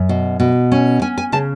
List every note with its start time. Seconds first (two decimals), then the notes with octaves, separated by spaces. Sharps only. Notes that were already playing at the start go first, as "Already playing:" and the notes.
Already playing: F#2
0.09 B2
0.40 B2
0.72 C#4 G#5
1.02 C#4 G#5
1.18 G#5
1.32 C#3 A5